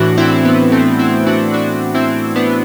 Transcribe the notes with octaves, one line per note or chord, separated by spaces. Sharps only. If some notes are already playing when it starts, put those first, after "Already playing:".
Already playing: A2 E3 D4 F#4
C4 E4
B3
A3 C4
C4 E4
D4 F#4
D4 F#4
C4 E4
B3 D4